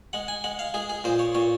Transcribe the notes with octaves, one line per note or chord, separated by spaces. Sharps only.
G#3 F#5
G#5
G#3 F#5
F5
G#3 G#4
G#4
A#2 C5
C#5
A#2 C#5